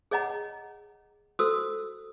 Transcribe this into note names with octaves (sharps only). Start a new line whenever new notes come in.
G#4 C#5 D#5 F#5 A#5
F#4 A4 C5 D#6 E6